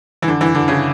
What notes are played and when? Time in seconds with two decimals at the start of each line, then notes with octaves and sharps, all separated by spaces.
0.22 E3
0.28 D3
0.41 E3
0.55 D3
0.68 C#3